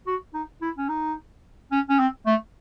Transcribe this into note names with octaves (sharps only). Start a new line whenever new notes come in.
F#4
D#4
E4
C#4
D#4
C#4
C#4
C4
A3